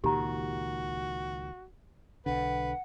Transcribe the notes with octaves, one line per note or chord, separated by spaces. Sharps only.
C#2 A#2 D#3 F#4 G4 A#5
B1 D3 B4 F#5